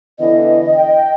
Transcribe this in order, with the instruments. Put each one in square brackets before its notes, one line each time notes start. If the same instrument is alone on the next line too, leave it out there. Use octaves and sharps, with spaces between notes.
[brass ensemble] D3 E3 B3 [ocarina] D#5
[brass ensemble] G5